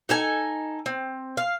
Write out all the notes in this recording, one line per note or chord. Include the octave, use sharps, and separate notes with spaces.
D#4 A4 G#5
C4
F5